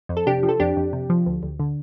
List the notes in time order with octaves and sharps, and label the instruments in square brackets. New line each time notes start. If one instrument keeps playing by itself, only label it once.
[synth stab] F2
A4
C3 D4 G4
F3
A4
F2 D4 G4
F2
C3
F3
D2
D2
D3